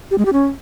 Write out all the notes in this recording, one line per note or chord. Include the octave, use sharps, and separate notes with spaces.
G4
G#3
G4
C#4